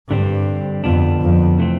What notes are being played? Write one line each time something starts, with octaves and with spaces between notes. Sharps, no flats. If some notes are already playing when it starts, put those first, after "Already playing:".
G2 D3 G3 C4
F2 D3 F3 B3 D4
F2
C3 E3 A3 C4